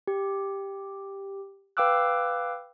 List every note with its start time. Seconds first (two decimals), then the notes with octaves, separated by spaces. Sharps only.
0.08 G4
1.77 B4 F5 G5 D6 E6 F#6